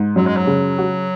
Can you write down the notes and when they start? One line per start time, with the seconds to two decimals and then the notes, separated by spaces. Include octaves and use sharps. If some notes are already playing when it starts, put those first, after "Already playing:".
Already playing: G#2
0.16 F#2 F#3
0.27 G#3
0.37 F#3
0.47 C#3
0.78 F#4